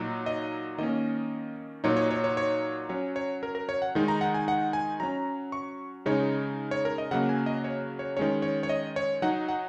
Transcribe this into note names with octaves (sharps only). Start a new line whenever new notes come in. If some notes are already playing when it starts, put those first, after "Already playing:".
Already playing: A#2 F#3 D#4
D#5
D#3 A#3 C#4 D#5
A#2 F#3 D#4 C#5
C#5
C#5
C#5
C#5
F#3 C#4 C#5
C#5
A#4
A#4
C#5
F#5
D#3 G#3 D#4
A#5
F#5
G#5
F#5
G#5
F#3 C#4 A#5
C#6
C#3 G#3 D#4 C#5
C#5
A#4
D#5
C#3 F#3 A#3 F#5
G#5
D#5
C#5
C#5
D#3 G#3 C#4 C#5
C#5
C#5
D#5
C#5
F#3 D#4 F#5
F#5